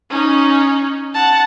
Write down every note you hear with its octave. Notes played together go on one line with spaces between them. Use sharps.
C#4 D#4
F#5 A5